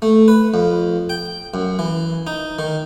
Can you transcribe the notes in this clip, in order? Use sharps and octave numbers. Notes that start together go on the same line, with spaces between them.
A3
B4
F2
G5
F#2
E3
D#4
D#3